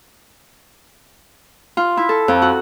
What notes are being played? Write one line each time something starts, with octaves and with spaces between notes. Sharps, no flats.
F4
E4
A4
F2
F#4